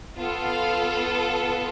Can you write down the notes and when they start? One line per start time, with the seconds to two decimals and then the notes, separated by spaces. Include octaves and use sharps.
0.16 B3 F4 A4
0.46 F5